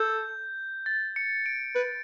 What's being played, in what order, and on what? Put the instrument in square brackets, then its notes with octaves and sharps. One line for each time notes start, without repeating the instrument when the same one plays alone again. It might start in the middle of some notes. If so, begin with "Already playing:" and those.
Already playing: [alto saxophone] A4 [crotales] G6
[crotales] A6
C#7
D7
[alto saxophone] B4